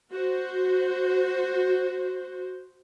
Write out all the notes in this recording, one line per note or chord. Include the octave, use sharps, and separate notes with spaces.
F#4 C5